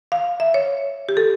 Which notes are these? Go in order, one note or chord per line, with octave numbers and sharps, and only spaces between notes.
F5
E5
C#5
G4
A4